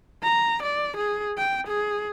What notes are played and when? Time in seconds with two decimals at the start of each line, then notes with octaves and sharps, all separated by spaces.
0.23 A#5
0.63 D5
0.97 G#4
1.38 G5
1.67 G#4